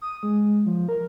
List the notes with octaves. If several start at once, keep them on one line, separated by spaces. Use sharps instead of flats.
D#6
G#3
F3
A#4